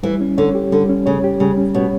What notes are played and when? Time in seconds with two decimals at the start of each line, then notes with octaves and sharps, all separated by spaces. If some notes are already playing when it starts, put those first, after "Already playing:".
0.03 E3 G3
0.21 C#4
0.38 D3 C#5
0.55 G4
0.72 D3 G3
0.89 C#4
1.06 C#3 C#5
1.24 G4
1.40 C#3 G3
1.57 C#4
1.74 B2 C#5